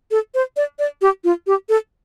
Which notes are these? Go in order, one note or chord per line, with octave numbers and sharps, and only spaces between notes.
A4
C5
D5
D5
G4
F4
G4
A4